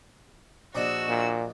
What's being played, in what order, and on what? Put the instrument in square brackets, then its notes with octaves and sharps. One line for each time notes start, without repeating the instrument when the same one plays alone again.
[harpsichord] A#1 D4 D#5 [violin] F#4 E6
[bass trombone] A#2